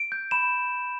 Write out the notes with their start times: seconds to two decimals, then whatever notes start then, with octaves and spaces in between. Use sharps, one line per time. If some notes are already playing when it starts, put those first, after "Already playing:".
Already playing: D7
0.12 G6
0.31 B5 E7